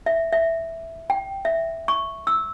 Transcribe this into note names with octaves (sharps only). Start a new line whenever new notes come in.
E5
E5
G5
E5
C#6
E6